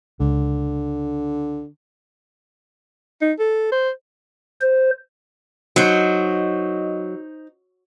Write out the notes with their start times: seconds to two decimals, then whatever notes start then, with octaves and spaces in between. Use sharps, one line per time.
0.20 C#2 D3
3.22 D#4
3.39 A4
3.72 C5
4.61 C5
5.76 F#3 D#4 C5 D#5